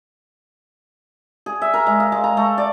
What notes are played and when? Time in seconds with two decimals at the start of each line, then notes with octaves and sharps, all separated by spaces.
1.46 G#4
1.62 E5
1.74 A#4
1.87 G#3
2.00 F5
2.12 G#3
2.24 A#5
2.37 A3
2.58 D5